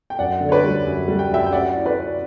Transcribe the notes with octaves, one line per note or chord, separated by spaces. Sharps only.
G5
F#2 D5 F#5
D3
C#5
B4 D5
G3
F#2
G3
G5
F#2 E5 G5
G5
C#4 D5 F#5
E4
B4 D5
C#4